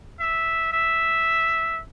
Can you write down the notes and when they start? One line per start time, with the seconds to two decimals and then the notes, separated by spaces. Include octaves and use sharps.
0.20 E5
0.73 E5